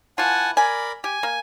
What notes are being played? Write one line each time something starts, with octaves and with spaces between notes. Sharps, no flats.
E3 F4 F#5 G#5 A5
A#4 D5 G#5 B5
G4 G#5
A#3